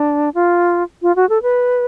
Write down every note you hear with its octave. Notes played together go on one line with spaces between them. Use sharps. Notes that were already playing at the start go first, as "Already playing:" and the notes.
Already playing: D4
F4
F4
F#4
A4
B4